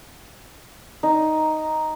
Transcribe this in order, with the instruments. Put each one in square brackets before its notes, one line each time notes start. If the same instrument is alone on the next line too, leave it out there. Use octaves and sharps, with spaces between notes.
[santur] D#4